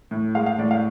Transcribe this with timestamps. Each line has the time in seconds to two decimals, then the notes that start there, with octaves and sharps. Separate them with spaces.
0.11 A2
0.35 G#3 F5
0.46 F5
0.58 A2 D5
0.71 F5